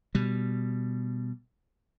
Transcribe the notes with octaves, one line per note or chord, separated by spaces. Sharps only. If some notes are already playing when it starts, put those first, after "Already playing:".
B2 G3